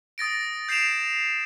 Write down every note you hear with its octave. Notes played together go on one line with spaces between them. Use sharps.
D#6 A6 A#6 D7
G6 C7 D7 E7 F7